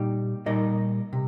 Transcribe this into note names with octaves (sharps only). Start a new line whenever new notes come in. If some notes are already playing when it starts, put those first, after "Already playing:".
Already playing: A#2 G3 D#4 G4
A#2 G3 D#4 A#4 D#5
C3